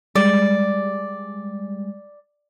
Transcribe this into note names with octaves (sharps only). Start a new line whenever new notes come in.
G3 G#3 D5